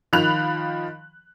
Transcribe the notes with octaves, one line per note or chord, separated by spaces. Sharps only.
D#3 F3 B5 F#6 F7